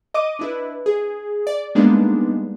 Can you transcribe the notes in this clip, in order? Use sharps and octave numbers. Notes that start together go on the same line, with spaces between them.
D#5 D6 D#7
D4 E4 B4
G#4
D5
G3 G#3 A#3 B3 D4 D#4